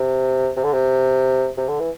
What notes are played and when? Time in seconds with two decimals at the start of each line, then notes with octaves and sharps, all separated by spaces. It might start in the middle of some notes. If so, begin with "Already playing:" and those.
Already playing: C3
0.57 C3
0.63 D3
0.73 C3
1.57 C3
1.68 D3
1.80 E3